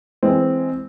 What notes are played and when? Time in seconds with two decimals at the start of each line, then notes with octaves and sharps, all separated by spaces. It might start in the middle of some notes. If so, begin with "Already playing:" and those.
0.23 E3 G#3 C4